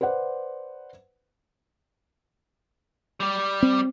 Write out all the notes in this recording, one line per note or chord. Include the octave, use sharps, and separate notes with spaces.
B4 C5 D5 F#5
G3 D5
C4